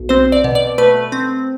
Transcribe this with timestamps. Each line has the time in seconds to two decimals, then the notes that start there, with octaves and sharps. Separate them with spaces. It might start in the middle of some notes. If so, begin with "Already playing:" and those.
Already playing: B1
0.09 C4 C5
0.32 D5
0.44 B2
0.55 D5
0.78 A3 B4
1.12 C4